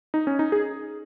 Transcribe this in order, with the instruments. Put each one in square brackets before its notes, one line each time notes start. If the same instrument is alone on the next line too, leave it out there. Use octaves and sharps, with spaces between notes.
[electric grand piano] D#4
C#4
D#4
G#4